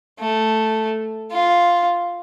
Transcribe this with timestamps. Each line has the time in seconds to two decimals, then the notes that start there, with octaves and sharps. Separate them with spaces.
0.20 A3
1.32 F4